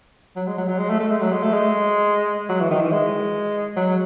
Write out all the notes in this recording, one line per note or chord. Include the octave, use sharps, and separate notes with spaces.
F#3
G#3
F#3
F#3
G#3
A3
A3
G#3
F#3
G#3
A3
G#3
F#3
E3
D#3
E3
G#3
F#3